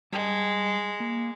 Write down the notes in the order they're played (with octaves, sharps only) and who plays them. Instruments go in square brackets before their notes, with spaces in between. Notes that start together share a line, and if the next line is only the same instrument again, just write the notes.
[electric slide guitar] G3 A5 [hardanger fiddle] G#3
[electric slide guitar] A#3